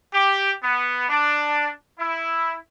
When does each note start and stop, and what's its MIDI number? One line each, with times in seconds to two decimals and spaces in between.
0.13 0.51 67
0.63 1.06 59
1.09 1.68 62
1.99 2.55 64